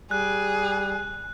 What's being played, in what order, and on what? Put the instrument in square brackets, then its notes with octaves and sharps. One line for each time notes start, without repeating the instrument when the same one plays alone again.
[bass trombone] G3 [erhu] G#4 [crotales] F#6